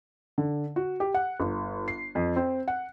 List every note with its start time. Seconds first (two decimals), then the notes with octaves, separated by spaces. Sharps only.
0.38 D3
0.76 F#4
1.00 G4
1.14 F#5
1.40 G1
1.88 C7
2.15 F2
2.36 C4
2.68 F#5